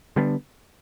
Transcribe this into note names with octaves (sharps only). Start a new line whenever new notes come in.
D3 G3 B3 D4